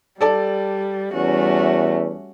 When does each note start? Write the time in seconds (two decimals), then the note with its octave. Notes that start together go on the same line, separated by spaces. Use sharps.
0.21 G3 A4 D5 A5
1.13 E2 G3 A3 C#4 F#4